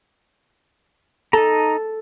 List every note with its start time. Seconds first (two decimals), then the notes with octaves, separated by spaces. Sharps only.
1.33 D#4 A4 A#5